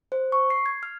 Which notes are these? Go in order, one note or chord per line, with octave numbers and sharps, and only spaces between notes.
C5
C#6
C7
G#6
F6